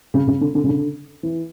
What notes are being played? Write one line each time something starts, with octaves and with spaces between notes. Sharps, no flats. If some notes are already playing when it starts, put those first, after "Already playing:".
C#3
C#3
D3
D3
C#3
D3
E3